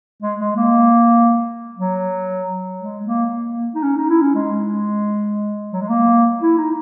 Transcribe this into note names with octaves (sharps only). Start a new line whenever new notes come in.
G#3
G#3
A#3
F#3
G#3
A#3
A#3
D#4
C#4
D#4
E4
C#4
G#3
F#3
G#3
A#3
E4
D#4